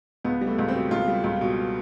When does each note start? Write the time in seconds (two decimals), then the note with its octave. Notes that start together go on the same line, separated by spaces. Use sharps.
0.25 C#2 B3
0.41 G3
0.47 A3
0.59 C#2
0.68 C4
0.75 B2
0.91 C#2 F4
1.08 G3
1.24 C#2
1.41 B2